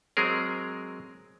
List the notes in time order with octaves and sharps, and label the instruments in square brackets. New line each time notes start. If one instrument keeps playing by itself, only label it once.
[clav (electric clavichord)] F#3 G#3 C4 G#4 A#4